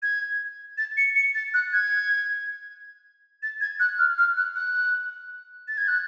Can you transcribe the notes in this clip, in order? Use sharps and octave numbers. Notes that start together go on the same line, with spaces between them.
G#6
A6
C#7
C#7
A6
F#6
G#6
A6
G#6
F#6
F6
F6
F#6
F#6
A6
G#6
F#6